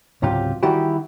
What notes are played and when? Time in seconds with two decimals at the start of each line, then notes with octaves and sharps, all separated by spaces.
0.22 C#2 G#2 C3 F#3 F4 G4
0.63 D#3 E3 G3 E4 F#4 G4